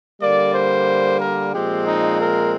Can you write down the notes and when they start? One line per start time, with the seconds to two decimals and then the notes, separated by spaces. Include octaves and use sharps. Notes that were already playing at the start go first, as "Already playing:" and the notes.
0.21 D3 G3 A#3 D5
0.53 C5
1.20 A#4
1.52 A#2 F3 G#3 C4 G4
1.86 D#4
2.18 A#4